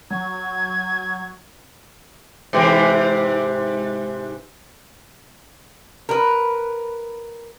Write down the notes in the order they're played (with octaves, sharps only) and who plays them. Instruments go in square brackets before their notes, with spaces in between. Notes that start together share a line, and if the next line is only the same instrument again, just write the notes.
[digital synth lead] F#3 [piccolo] G#6
[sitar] G#2 C3 E3
[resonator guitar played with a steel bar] A#4 B4